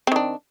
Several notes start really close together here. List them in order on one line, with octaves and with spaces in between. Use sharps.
C4 D#3 D4